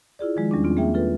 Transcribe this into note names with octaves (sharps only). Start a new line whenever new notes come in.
E4 F4 G#4 D5
D#3 F3 G#3
E2 G3 C#4 D4
C4 F4
A#3 G#4 E5 G5
F4 A4 B4